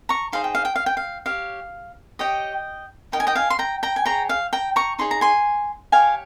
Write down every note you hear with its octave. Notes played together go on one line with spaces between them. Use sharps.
A#5 C#6
D#4 G#4 C5 F5
G5
F5
G5
F5
G5
F5
G4 C#5 F5
G4 C#5 D#5 G5
D#4 A#4 D#5 G5
G#5
D#5 G5
F5 G#5
C6
G5 A#5
G5 A#5
G#5
G#4 C#5 G5 A#5
F5
G5 A#5
A#5 C#6
D#4 G#4 C#5 C6
A#5
G#5 C6
G4 C#5 F5 G#5